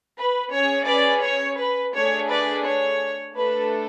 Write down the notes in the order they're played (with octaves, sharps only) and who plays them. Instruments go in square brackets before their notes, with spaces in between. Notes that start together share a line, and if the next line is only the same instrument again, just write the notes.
[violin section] B4
C#4 G#4 C#5
B4 D5
C#5
B4
A3 D4 G#4 C#5
B4 D5
C#5
A3 D4 A4 B4